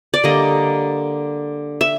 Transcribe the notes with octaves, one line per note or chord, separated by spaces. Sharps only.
D5
D3 G3 A#3 D#5
E5